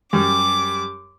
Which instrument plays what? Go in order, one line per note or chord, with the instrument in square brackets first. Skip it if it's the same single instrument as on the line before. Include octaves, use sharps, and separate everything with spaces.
[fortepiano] F#2 G3 [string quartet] D6